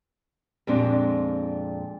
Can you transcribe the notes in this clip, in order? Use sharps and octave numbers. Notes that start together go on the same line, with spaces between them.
F2 A#2 G#3 C4 D4